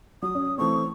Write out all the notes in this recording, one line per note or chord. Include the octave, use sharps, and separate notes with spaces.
F#3 D#6
C#4
E3 A3 C4 C#6